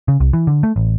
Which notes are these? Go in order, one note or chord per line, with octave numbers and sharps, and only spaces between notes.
C#3
C2
E3
D3
A3
A1